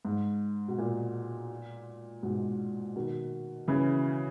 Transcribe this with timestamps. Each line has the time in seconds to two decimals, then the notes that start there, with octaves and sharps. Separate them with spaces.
0.05 G#2
0.68 B2
0.78 A#2
2.23 G#2 B2
2.96 B2 D#3
3.68 C#3 E3